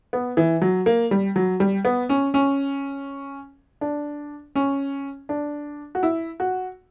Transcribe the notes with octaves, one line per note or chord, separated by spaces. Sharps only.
B3
E3
F#3
A#3
G3
F#3
G3
B3
C#4
C#4
D4
C#4
D4
F#4
E4
F#4